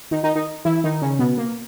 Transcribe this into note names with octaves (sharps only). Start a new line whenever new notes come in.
D#3 D#4
D#3 D#4
D#3 D#4
E3 E4
D#3 D#4
C#3 C#4
B2 B3
A#3